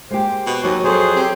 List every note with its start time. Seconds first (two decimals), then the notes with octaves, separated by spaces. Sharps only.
0.11 G#3 A#3 G4 C5
0.46 B2
0.64 D#2 F#3 F#4 G#5
0.84 F2 F#3 G#4 A4 C5
1.16 C4 G4